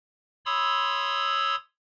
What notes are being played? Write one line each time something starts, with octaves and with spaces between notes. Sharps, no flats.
C#5 B5 C6 D#6 E6